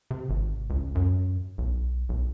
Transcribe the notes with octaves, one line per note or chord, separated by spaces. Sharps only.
C3
G#1
C#2
F#2
B1
B1